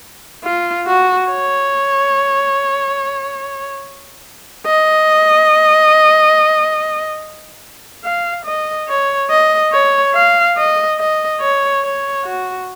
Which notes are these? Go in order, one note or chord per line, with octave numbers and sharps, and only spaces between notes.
F4
F#4
C#5
D#5
F5
D#5
C#5
D#5
C#5
F5
D#5
D#5
C#5
C#5
F#4